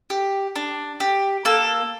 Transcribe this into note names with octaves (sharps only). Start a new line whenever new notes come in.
G4
D4
G4
A#3 A4